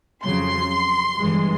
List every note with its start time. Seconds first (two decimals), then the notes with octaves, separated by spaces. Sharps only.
0.23 F2 C#3 F#3 C6
1.18 G1 G2 E3 G#3